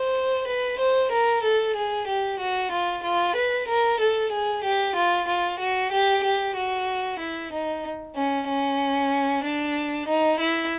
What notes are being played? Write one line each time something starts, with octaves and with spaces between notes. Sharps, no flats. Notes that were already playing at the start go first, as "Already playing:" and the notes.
Already playing: C5
B4
C5
A#4
A4
G#4
G4
F#4
F4
F4
B4
A#4
A4
G#4
G4
F4
F4
F#4
G4
G4
F#4
E4
D#4
C#4
C#4
D4
D#4
E4